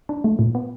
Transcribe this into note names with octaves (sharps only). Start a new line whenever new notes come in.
D4
A3
A#2
B3